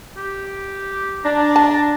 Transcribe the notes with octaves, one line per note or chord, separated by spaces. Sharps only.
G4
D4 A#5
A5